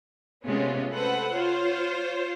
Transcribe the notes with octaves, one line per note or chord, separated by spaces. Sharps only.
C3 G#3 A3 B3 C#4 F4
A4 B4 C5 F#5
F4 C5 C#5